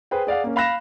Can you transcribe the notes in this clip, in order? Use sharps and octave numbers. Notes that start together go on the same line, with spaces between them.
G#4 B4 C5 G5
G#4 D5 F5 F#5
A#3 C#4
F5 B5 F#6 A#6 E7